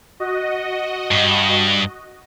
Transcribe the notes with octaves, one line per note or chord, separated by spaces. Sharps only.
F#4 D#5
G2